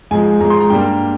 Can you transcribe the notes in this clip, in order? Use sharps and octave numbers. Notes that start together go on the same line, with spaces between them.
G#2 F3 G#3 G#5
G#2 F3 G#3 A#5
C6
A#5
G2 G3 A#3 G5